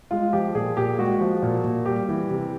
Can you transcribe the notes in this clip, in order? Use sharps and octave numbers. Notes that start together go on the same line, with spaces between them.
G#3 F4
F3 G4
A#2 G#4
A#2 G4
G#3 F#4
F3
A#2
A#2
G3 G4
E3
C3